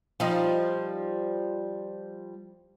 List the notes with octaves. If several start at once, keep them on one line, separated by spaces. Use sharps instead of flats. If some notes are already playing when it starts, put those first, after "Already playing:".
F3 G3 D#4